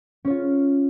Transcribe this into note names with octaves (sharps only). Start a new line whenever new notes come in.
C#4 F4 C#5